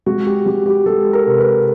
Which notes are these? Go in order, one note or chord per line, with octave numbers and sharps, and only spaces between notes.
G#3 F#4
G4
G#3 F#4
G4
G#3 A4
A#4
C3
B4